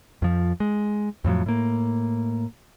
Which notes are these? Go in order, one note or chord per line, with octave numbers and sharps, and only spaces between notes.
F2 F3
G#3
F2 A2 F3 F#3
A2 A#3